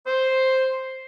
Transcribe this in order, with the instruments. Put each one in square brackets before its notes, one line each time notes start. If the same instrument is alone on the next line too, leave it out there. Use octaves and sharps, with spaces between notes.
[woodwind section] C5